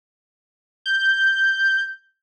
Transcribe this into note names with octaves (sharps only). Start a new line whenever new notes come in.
G6